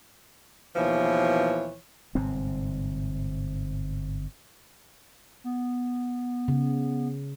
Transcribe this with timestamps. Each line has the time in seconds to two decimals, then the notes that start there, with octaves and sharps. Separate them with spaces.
0.76 D#2 B2 E3 F3 C#5
2.15 G1 G#2 C3 C4
5.44 B3
6.48 C#3